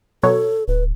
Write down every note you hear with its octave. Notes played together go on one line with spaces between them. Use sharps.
B2 F#3 A4 C#5
D1 B4